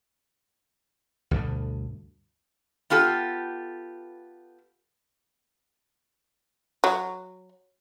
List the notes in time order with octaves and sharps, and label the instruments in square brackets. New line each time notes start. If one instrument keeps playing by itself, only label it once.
[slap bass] D2 G2 B2 D3
[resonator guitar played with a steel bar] B3 F4 G4 A4
[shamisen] F#3